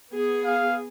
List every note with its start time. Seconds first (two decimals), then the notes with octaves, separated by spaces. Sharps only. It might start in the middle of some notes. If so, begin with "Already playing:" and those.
0.12 B3 G#4
0.45 F5